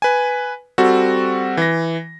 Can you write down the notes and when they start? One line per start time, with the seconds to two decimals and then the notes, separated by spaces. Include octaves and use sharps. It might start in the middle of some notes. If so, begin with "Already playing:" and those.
0.02 B4 G#5
0.78 G3 C4 F#4 A4
1.57 E3 A#6